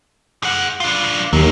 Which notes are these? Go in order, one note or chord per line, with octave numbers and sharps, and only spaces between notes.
G#4 F#5
D4 F4
D#2 F#3 G#4